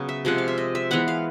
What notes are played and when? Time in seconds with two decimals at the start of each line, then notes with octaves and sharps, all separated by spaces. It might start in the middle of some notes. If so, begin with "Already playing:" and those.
Already playing: C#3 F#3 B3
0.09 E5
0.25 C3 F3 G#3 F#5
0.38 F5
0.48 E5
0.58 D#5
0.75 E5
0.91 E3 G#3 B3 F#5
1.08 F5